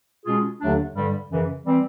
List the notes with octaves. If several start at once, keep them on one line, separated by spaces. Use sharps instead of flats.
B2 G#3 C#4 F4 G#4
D#2 D3 F#3 A3 D4
G2 D3 G3
F#2 C#3 E3
E3 G3 C4